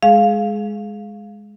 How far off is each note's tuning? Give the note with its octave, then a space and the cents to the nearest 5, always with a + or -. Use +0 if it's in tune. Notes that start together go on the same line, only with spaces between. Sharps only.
G#3 +0 G#4 +25 F5 +0